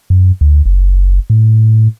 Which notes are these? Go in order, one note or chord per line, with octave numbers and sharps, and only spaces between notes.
F#2
D2
F#1
A2